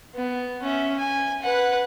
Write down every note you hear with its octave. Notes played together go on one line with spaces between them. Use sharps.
B3
C#4 E5
G#5
B4 F#5